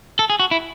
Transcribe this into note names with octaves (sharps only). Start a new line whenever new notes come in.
A4
G#4
F#4
E4